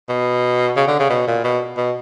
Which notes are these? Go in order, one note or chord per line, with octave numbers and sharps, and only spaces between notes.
B2
C#3
D3
C#3
B2
A#2
B2
B2